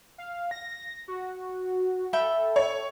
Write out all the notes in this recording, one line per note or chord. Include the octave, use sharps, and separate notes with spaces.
F5
A#6
F#4
A4 E5 G5 B5
C#5